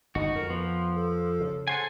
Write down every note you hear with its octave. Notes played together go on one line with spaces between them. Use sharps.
G1 D#4 F#4
F2 A#4
F3 B3
A4
C#3
A4 C5 F#5 G#5